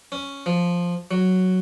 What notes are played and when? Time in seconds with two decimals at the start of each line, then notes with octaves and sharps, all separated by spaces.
0.12 C#4
0.46 F3
1.11 F#3